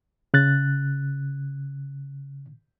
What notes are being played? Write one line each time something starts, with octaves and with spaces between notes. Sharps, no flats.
C#3 F#6 A6